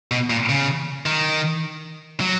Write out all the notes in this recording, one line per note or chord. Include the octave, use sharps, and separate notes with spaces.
B2
A#2
C#3
D#3
F#3